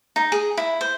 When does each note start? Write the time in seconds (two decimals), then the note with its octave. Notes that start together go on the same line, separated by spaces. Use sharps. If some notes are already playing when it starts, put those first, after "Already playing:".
0.16 D#4
0.32 G#4
0.57 E4
0.81 C5